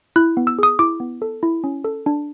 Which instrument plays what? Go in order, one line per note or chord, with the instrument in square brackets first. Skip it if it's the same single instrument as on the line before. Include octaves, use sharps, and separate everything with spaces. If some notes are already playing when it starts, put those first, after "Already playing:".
[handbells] E4 F#6
B3
E6
G#4 D#6
E4 D6
B3
A4
E4
C#4
A4
D4